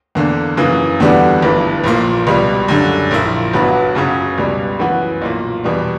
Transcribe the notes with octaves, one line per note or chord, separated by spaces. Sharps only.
E2 D3 A#3
F#2 C#3 E3 A#3
E2 D3 G3 B3 F#4
G1 G2 E3
A#1 A#2 A#3
C#2 B2 G3
F#2 D3 G3
A#1 A#2 A#3 E4
G1 G2 F#3 B3 F#4
F#2 C#3 F#3 C#4
C#2 B2 G3
F#2 E3 B3 F#4 B4
B1 A#2 A#3
E2 B2 G3